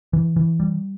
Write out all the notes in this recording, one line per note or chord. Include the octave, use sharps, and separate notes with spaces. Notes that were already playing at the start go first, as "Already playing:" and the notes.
E3
E3
G3